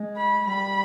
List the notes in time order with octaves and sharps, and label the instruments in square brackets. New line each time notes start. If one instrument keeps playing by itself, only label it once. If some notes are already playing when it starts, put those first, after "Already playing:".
Already playing: [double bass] G#3
[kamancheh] B5
[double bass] G3 [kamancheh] B5